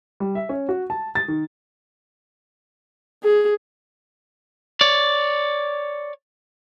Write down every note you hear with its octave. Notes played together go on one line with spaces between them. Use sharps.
G3
E5
C#4
F#4
A5
A6
D#3
G#4
C#5 D5